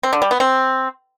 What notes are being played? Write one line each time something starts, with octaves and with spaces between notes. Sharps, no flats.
C4
D3
G3
B3
C4